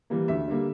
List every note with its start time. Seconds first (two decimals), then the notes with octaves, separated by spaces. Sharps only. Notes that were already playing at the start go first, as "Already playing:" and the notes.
0.10 E3 G3 A#3
0.28 D2 E5
0.48 D3 G3 A#3